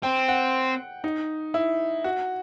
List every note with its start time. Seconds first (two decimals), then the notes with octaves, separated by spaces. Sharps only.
0.03 C4 G5
0.28 F#5
1.04 D#4
1.54 E4
2.04 F#4